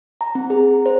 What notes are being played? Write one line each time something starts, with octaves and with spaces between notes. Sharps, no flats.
A#5
C4
G#4
C5